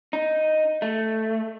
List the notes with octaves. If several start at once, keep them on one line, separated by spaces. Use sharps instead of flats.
D#4
A3